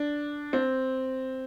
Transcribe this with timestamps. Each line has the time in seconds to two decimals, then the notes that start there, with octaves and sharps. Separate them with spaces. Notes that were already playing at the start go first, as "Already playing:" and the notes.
Already playing: D4
0.53 C4